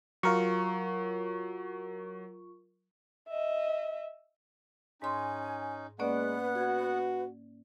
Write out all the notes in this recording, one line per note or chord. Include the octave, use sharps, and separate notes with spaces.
F#3 F4 A#4 C#6
D#5 E5
G#2 C#4 D#4 G#5 C6
G#3 A#3 B3 C#4 B4 D5 F#5
F#4 G#6